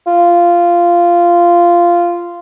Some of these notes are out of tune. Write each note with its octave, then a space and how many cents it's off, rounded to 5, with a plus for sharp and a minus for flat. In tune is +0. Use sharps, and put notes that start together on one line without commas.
F4 -10